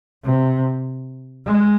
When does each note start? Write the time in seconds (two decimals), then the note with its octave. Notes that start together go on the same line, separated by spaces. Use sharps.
0.24 C3
1.46 G#3